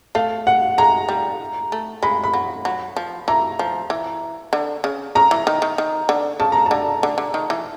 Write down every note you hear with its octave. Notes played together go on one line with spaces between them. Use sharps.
A3 F5
F#5
G#3 A#5
G3
A3
G#3 B5
B5
F#3
F#3
F3
E3 A#5
F3
E3
D3
C#3
C#3 A#5
E3
D#3
D#3
D#3
D3
C#3 A5
A#5
D3 A5
D3
D3
D#3
E3